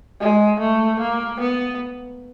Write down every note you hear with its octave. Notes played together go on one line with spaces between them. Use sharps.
G#3
A3
A#3
B3